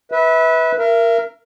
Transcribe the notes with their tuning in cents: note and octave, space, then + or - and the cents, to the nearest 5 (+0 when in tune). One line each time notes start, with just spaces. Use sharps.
B4 -5 E5 -30
A#4 +0 E5 +35